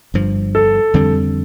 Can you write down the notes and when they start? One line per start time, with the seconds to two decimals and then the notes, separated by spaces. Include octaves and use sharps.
0.14 G1 G2 F3
0.55 A4
0.94 F2 D3 G3 C4